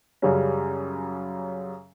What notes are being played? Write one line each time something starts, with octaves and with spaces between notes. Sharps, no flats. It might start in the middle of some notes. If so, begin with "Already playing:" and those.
F#2 C#3 G3 C#4